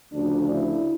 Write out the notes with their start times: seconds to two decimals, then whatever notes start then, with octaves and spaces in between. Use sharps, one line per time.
0.13 D2 C#3 F3 D4
0.50 E4